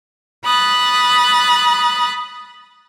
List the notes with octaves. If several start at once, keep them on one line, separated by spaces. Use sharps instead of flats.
B5 D#6 F#6 A6